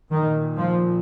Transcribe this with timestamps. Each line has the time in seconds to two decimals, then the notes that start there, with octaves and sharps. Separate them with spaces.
0.11 A#2 D#3
0.57 F3